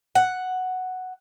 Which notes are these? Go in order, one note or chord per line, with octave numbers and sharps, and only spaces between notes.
F#5